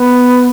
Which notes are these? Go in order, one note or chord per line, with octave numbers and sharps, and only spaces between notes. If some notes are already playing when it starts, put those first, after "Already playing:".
Already playing: B3